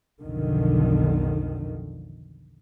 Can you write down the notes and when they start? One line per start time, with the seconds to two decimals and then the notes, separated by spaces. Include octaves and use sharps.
0.22 B1 F2 D3 D#3